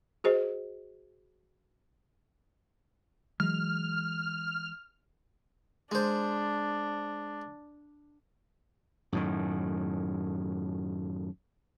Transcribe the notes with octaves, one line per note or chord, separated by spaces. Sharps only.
F#4 G#4 C5 D#5
E3 F#3 G#3 F6
G#3 D4 C5
F#2 A2 D#3